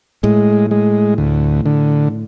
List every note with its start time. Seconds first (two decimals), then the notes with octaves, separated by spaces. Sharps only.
0.23 A2 G#3
0.71 G#3
1.18 D2
1.66 D3